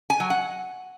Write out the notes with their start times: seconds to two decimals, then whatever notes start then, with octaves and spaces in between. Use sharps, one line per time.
0.10 G#5
0.20 F#3
0.30 F#5